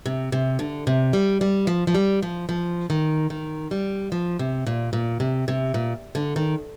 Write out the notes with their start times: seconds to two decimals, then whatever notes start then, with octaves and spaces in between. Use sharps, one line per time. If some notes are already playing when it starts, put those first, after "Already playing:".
0.06 C3
0.32 C3
0.59 D3
0.87 C3
1.13 G3
1.41 G3
1.67 F3
1.87 F3
1.94 G3
2.22 F3
2.49 F3
2.90 D#3
3.30 D#3
3.71 G3
4.12 F3
4.39 C3
4.67 A#2
4.93 A#2
5.20 C3
5.48 C3
5.74 A#2
6.15 D3
6.36 D#3